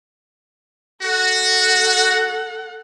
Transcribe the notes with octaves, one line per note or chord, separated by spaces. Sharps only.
F#4 A4 F#5